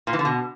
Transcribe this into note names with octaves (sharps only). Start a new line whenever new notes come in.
A#2
E3
D3
B2